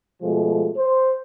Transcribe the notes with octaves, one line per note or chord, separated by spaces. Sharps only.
B2 F3 G#3 A3
C5